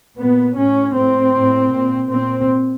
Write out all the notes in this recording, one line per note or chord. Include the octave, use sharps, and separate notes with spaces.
A#2 B3
A2 C#4
A2 C4
A2
A#2
A#2 C4